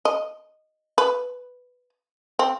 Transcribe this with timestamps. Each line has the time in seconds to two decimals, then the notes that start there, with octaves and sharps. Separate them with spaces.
0.05 D#5
0.98 B4
2.39 C4